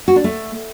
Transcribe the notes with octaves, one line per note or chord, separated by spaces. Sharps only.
F#4
D4
A3